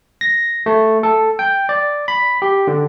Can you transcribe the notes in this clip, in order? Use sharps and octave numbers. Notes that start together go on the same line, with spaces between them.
A#6
A3
A4
G5
D5
B5
G4
D3